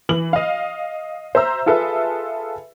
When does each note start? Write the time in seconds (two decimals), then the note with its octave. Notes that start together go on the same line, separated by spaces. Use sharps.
0.09 E3 F#7
0.33 D#5 F5
1.35 C5 E5 A#5 E6
1.66 F4 G#4 A4 B4 E5